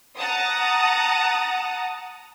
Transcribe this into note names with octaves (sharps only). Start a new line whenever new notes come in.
F#5 A5 A#5 D#6